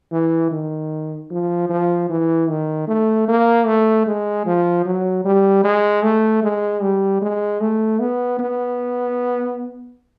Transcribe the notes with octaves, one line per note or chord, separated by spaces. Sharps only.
E3
D#3
F3
F3
E3
D#3
A3
A#3
A3
G#3
F3
F#3
G3
G#3
A3
G#3
G3
G#3
A3
B3
B3